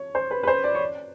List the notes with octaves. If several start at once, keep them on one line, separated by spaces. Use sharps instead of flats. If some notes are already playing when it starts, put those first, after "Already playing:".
Already playing: C#5
C5
B4
B4
C5
D5
C#5
D5